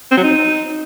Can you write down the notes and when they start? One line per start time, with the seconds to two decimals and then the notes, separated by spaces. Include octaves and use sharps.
0.11 C4
0.17 F#3
0.23 D#4